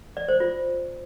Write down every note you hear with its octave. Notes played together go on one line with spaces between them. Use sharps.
D5
C5
F4